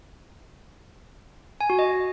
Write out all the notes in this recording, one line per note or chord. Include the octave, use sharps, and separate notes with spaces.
G#5
F#4
D#5